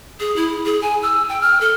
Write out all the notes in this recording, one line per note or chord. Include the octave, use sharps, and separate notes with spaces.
G#4
E4
G#4
G#5
E6
G5
F6
A4